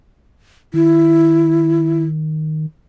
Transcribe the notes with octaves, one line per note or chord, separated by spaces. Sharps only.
D#3 E4